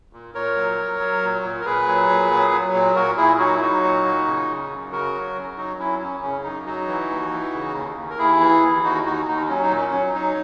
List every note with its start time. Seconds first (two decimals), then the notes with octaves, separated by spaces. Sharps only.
0.13 A#2
0.34 A#2 A#4 C#5
0.56 F#3
0.79 F#3
0.99 F#3
1.22 A#2
1.43 A#2
1.61 A#4
1.65 A#2 G#4 B4
1.87 F#3
2.09 A#2
2.31 F#3
2.52 F#3
2.74 A#2
2.96 A#2 F#4 A#4
3.17 A#2 E4 G#4
3.39 F#3 D#4 F#4
3.54 E4
3.61 F#3 D#4 F#4
3.83 A#2
4.05 A#2
4.26 C#3
4.49 C#3
4.71 F#2
4.92 C#3 F#4 A#4
5.14 F#3
5.35 F#2
5.57 F#3 D#4 F#4
5.78 F#3 C#4 E4
6.01 F#2 C#4
6.22 C#3 C#4
6.44 F#2 D#4
6.66 F#3 D#4 F#4
6.87 E3
7.10 D#2
7.31 E3
7.54 C#3
7.75 D#2
7.97 D#2
8.10 A#4
8.18 D#2 E4 G#4
8.40 E3
8.63 D#2
8.84 D#2 D#4 F#4
9.05 D#2 D#4 F#4
9.27 D#2 D#4
9.49 F#3 C#4
9.63 D#4
9.71 A#2
9.76 C#4
9.93 F#3
10.14 F#3 D#4